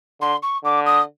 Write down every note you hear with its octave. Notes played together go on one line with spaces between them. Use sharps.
D3 C6
C#6
D3 D6
D#6